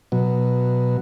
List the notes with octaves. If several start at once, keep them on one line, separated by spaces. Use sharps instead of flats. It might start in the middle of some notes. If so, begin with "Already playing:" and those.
B2 F#3